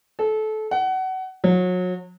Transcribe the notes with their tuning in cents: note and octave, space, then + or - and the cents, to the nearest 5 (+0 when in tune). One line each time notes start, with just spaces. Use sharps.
A4 -25
F#5 +25
F#3 -30